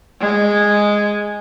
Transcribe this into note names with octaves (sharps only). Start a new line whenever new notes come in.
G#3